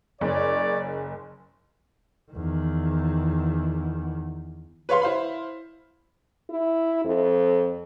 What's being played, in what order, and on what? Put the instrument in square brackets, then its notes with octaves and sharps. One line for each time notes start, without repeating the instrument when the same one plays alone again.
[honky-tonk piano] F#1 [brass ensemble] C#5 D5
[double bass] E2 D#3
[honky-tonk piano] B4 C#5 F5 C6
E4 C5 F5 B5
[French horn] E4
F2